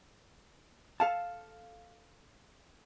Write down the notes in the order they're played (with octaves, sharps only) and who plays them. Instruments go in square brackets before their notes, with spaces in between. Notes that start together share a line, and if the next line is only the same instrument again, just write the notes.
[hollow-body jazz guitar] A4 F5 A5